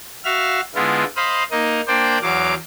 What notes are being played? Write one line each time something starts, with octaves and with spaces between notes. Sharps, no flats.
F#4 E5 F5 F6
D3 G#3 B3 E4 F4
C5 D#5 F5 B5
A#3 D#4 D#5
A#3 D4 C5 D5 G5
E2 F#3 F5 D6